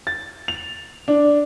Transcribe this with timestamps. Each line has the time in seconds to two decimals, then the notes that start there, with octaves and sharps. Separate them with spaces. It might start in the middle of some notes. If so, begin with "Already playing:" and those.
0.07 A6
0.48 F7
1.08 D4